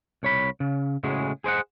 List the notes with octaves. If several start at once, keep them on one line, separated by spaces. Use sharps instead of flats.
C2 C#5 B5
C#3
A2 C#3 G#3 F#4 G#4
G#4 C5 D#5 F#5